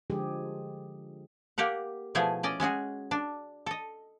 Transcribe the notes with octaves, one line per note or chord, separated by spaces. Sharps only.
D3 F3 G#3 G4 G#4
A#3 G4 A#4 F#5
B2 F3 A3 E4 G#4 G#5
C#4 D5 D#5
G#3 C#4 F#4 G#4
D4
A4 D#5